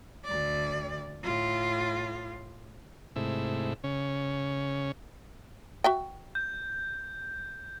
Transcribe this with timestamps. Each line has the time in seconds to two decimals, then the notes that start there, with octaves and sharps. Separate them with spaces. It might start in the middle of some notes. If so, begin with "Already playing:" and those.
0.25 D2 D5
1.24 A2 F4
3.16 G#2 C3 A3 E4
3.84 C#3 C#4
5.84 F#4 E5 G5
6.35 G6